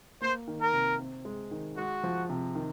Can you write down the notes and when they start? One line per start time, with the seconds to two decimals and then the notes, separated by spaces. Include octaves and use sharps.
0.21 A#3 C5
0.48 D#3
0.60 A#4
0.73 C3
1.00 C4
1.25 G#3
1.51 D#3
1.77 G#3 F#4
2.04 F3
2.29 C3
2.55 D#3